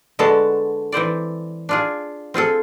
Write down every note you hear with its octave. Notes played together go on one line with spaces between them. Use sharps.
D3 G#3 B3 F#4 A4 A5
E3 C4 C5 D5
D4 F4 G#4
C4 F4 G#4 A4